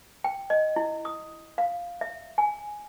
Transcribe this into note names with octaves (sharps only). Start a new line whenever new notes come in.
G5
D#5
E4
D#6
F5
E5
G#5